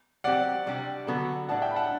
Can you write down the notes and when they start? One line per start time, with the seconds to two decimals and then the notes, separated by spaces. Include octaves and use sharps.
0.24 F#3 C4 G4 D5 F#5
0.66 C3 G3 D4 G4
1.07 D3 F#3 B3 F#4 A4
1.48 A2 G3 D4 F#5 A5
1.62 E5 G5
1.71 B5
1.76 F#5 A5